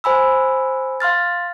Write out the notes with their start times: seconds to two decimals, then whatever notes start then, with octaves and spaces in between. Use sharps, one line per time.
0.04 C5 G#5 B5 E6
1.00 F5 C6 F6 A6